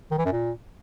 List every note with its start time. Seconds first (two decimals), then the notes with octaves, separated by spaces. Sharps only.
0.11 D#3
0.18 E3
0.25 F#2
0.33 A#2